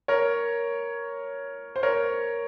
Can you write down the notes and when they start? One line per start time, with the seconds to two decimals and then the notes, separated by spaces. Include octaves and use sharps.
0.08 A#4 C#5
1.76 C5
1.83 A#4 C#5